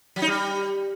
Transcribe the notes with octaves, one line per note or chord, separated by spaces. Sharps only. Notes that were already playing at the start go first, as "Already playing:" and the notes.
F#3
D#4
G3